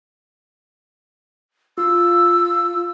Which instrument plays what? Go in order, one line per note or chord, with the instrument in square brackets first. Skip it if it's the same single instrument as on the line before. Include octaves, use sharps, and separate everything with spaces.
[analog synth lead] F4 [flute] E6